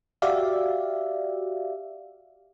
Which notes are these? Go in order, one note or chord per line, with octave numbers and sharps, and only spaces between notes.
F#4 G4 D5 E5 F5